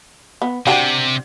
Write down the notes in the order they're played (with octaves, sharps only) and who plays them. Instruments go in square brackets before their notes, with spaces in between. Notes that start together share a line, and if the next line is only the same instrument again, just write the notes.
[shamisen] B3
[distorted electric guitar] C3 [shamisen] D4 F#4 G4